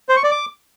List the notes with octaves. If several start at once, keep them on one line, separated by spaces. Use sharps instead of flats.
C5
C#6
D5
D6